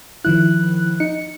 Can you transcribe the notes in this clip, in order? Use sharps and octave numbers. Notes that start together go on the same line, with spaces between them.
D#3 F3 E4 F#6
D#4 C#7